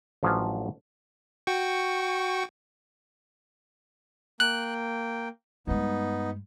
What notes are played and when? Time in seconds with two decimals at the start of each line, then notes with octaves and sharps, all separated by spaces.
0.23 A1 F3 F#3 D4 F5 G#5
1.47 F#4 G5 C#6
4.40 A#3 G5 F#6
5.67 G2 G#3 B3 D#4